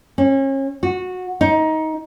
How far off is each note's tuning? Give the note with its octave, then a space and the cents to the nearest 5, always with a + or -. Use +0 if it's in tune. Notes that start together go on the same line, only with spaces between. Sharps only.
C#4 -35
F#4 -15
D#4 +20